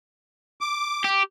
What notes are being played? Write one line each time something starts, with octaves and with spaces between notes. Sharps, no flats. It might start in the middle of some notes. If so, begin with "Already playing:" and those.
D6
G4